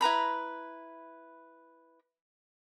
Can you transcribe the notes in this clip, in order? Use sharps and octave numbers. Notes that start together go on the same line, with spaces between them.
E4 B4 A#5 B5